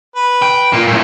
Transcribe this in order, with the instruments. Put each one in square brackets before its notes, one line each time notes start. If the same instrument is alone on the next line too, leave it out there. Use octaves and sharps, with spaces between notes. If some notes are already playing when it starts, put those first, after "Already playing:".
[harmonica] B4
[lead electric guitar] G5
[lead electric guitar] A#2 [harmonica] A#3
[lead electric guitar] F#2 A2